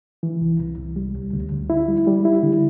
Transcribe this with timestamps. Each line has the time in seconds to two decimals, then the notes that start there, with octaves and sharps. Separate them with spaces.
0.23 E3
0.41 C2
0.60 C2
0.78 C2
0.96 G3
1.14 D2
1.33 D2
1.52 D2
1.70 E4
1.88 G3
2.07 G3
2.25 E4
2.43 D3